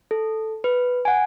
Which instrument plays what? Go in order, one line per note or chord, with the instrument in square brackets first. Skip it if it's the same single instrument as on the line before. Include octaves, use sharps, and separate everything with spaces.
[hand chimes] A4
B4
F#5 G#5